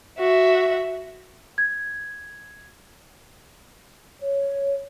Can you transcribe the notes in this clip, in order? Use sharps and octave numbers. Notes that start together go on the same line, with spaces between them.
F#4 E5
G#6
C#5